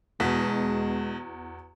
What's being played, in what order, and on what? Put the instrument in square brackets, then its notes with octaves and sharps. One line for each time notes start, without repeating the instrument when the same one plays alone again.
[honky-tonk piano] E2 F#4 B6 [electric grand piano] B2 [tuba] G#3